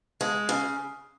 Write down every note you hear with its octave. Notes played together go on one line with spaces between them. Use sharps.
G#3
C#3